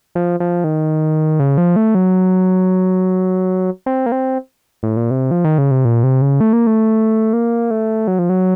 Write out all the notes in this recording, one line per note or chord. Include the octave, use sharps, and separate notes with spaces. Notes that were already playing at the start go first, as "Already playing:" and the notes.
F3
F3
D#3
C#3
F3
A3
F#3
C4
A#3
C4
A2
A#2
C3
F3
D#3
C#3
C3
A#2
C3
C#3
A3
A#3
A3
A#3
A3
F#3
F3
F#3